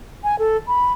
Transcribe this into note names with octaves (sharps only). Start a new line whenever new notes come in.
G#5
A4
B5